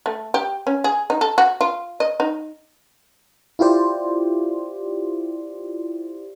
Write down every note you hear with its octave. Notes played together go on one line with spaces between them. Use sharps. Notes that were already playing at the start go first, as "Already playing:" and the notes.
A3
G4
C#4
G#4
D#4
A4
F#4
F4
D#5
D#4
E4 F4 G4 C5 D5